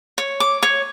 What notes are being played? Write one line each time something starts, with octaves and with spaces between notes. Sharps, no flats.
C#5
D6
C#5